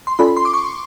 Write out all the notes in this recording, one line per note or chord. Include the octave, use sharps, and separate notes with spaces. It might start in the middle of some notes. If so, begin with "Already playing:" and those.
C6
C#4 F4 A4 D5 B5
C6
D6
C#6